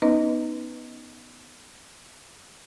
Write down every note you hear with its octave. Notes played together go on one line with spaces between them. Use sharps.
B3 C#4 D#4 B4 D#5